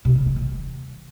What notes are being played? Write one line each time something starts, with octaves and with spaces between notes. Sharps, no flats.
C3
D3
G#3
D#3